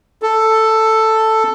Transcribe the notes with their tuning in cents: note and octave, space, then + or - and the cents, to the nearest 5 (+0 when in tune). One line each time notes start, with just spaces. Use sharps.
A4 +5